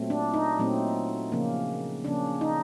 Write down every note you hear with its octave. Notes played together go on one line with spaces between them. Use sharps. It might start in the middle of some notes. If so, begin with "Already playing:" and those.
Already playing: A#2 F#3 A3 C4
D4
D#4
A#2 F#3 A3 C4
C#3 F3 A#3 C#4
C#3 F3 A#3 C#4 D4
D#4